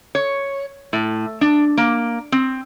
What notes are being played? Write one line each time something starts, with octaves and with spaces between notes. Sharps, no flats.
C#5
A2
D4
A#3
C4